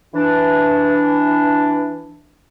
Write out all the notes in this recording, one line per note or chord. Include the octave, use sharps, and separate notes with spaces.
E3 D4